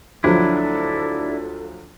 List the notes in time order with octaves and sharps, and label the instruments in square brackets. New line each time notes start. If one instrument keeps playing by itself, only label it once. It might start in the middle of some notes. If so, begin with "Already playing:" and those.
[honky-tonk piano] D2 F3 F#3 [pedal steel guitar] D4 E4 [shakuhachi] A4